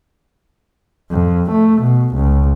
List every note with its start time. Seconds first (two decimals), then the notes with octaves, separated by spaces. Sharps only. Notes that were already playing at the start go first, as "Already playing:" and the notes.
1.11 F2
1.52 A3
1.82 B2
2.15 C#2